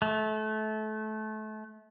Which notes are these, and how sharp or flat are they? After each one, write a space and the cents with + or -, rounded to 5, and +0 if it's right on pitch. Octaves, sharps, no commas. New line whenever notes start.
A3 -25